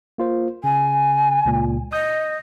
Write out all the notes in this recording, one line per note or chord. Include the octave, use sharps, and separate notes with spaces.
A#3 F4 C5
C#3 G#5
C#2 A#2
D#5 D#6 G6